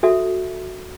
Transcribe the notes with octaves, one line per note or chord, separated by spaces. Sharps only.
F#4 A4 E5